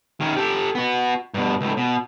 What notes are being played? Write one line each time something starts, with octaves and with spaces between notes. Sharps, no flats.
D#3 C#4
G4 A4
B3 F#4
G2 B2
C#2 A2
B2